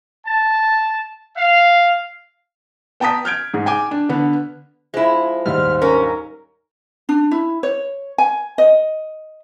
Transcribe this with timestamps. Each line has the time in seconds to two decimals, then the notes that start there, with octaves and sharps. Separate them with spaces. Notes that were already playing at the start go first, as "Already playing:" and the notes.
0.25 A5
1.36 F5
3.00 B3 G5 A5 A#5 D#6 B6
3.25 F6 G6 G#6 D7
3.54 G#2 G#4
3.66 G5 G#5 D6
3.91 D4
4.09 D3 B3 B4
4.94 F3 G#3 E4
5.46 D#2 G#2 G3 C5 F6
5.82 C#4 A#4
7.09 D4
7.31 E4
7.63 C#5
8.18 G#5
8.58 D#5